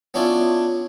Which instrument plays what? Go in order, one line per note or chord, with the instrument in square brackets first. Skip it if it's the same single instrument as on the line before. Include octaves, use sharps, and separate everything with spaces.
[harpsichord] B3 C#4 D4 E4 F4